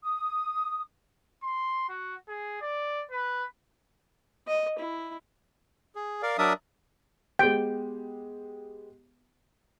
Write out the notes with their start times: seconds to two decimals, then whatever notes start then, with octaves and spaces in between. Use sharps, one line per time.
0.03 D#6
1.43 C6
1.89 F#4
2.29 G#4
2.61 D5
3.11 B4
4.48 D#5
4.79 E4
5.95 G#4
6.22 A#4 D5 F5
6.38 F#3 D4 A#4 D5 E5 D#6
7.39 G#3 B3 G4 G5